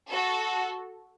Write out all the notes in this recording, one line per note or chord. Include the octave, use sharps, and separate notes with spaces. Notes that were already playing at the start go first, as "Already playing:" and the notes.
F#4 A4